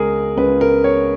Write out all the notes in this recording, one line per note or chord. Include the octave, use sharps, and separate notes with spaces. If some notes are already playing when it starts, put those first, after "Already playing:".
Already playing: C#2 C#3 G#3 G#4 A#4
C#2 C#3 G#3 B4
A#4
C#5